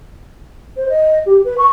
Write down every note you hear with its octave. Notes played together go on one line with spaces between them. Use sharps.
C5
D#5
G4
B4
C#6